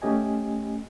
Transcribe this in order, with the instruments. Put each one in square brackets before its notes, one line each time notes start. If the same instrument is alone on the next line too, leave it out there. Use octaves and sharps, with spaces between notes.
[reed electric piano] A3 C#4 G4 D#5 G#5